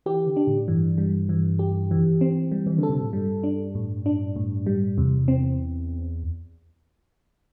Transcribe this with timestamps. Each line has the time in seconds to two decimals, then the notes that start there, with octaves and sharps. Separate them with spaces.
0.06 E3 G4
0.27 D3
0.36 D4
0.47 A2
0.68 G2 E3
0.98 G3
1.29 E3
1.59 G4
1.91 E3
2.21 C4
2.52 G3
2.66 E3
2.78 D3
2.83 A4
2.90 C3
3.02 A2
3.13 G2 G3
3.43 D4
3.75 A2
4.06 D4
4.36 A2
4.66 G3
4.97 E2 C3
5.28 C4